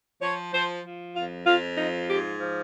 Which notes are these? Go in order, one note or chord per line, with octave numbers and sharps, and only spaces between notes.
F3 C#5
F3 C5
F3
F2 F4
F2 F4
F3 D#4
G#2 G4
F3